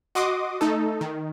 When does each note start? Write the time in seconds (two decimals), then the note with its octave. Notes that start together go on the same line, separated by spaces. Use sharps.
0.15 F#4 D#5 C6 D6 D#6
0.61 A3 D#4 A4
1.01 D#3